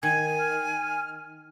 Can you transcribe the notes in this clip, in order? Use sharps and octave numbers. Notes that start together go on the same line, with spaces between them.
D#3 G#5 G#6
F6